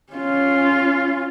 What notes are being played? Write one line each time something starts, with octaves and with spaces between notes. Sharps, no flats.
C#4 F4